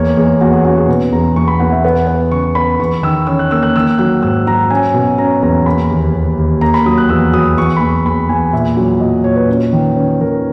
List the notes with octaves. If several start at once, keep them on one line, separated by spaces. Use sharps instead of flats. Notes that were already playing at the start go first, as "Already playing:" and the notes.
Already playing: E2 A#3 C#5
E2 G#4
E2 F#4
G#4
C#4 F#4
G#4
B2 B4
E2 A#5
E2 C#6
B5
E2 F#5
E5
B3 F#5
B3
C#3 C#6
B3 B5
E2 C#6
D#3 E6
C#4 E6
F#6
A#3 E6
F#6
D#3 E6
F#3 F#6
G#2 E6
F#3 A#5
C#4 G#5
B2
C#4 A#5
E2 A#5
A#3 B5
D#2
D#2
D#2
A#3 A#5
B5
F#3 D#6
F#6
E2 E6
F#3 D#6
E2 C#6
B5
E2 C#6
E2 B5
E2 G#5
A#2 E5
F#3
A#2 D#5
A#2 C#5
B4
C#4 C#5
D#3
C#4 B4
D#3 A#4